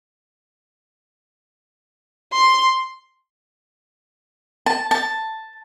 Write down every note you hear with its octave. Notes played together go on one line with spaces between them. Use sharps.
C6
A5
A5